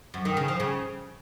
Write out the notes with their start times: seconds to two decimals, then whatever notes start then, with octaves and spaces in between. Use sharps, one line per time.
0.14 F#2
0.25 D#3
0.37 C#3
0.48 F3
0.60 C#3